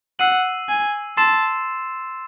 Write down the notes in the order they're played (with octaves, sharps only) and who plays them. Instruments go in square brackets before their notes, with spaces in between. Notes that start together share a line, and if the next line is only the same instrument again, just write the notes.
[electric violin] F#5 [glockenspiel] E6 C7 D#7 F#7
[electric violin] G#5
[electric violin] A5 [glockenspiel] C6 E6 A6 C7 E7